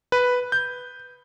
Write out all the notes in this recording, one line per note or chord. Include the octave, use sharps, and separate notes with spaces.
B4
G6